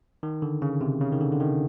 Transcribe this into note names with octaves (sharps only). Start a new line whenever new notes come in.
D#3
D3
C#3
C3
C#3
D#3
D3
D3
D#3